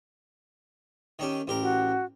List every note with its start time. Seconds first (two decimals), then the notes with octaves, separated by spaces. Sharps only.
1.19 D#3 C#4 G4
1.47 A1 G4 A#4
1.62 F#4